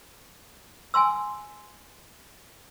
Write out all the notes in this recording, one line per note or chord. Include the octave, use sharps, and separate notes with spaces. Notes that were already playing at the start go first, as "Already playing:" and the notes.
G#5 A5 C6 E6